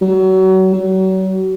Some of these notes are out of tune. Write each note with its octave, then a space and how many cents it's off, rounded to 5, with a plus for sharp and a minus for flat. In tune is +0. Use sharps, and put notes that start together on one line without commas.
F#3 +30
F#3 +35